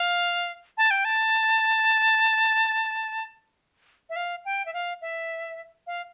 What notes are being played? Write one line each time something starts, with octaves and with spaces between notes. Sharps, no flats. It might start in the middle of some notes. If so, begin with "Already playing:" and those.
Already playing: F5
A5
G5
A5
E5
F5
G5
E5
F5
E5
F5